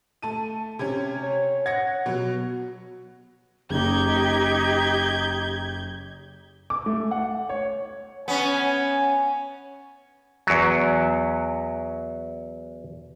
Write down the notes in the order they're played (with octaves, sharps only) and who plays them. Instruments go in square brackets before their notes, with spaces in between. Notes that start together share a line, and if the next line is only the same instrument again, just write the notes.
[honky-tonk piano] A3 A5 D#7
[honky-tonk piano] C3 C#4 [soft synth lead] G#6
[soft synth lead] C#5
[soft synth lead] F#5 [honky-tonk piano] G#6 A#6 C#7
[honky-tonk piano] B2 F#3
[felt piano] F#1 [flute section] D#4 G4 [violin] G6 G#6
[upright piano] D6
A3
F#5
C#5
[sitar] B3 C#4 [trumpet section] G#5
[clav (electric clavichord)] E2 F#3